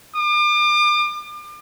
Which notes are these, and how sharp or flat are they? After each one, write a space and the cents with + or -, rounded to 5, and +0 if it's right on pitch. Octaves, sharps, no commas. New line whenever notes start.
D6 +40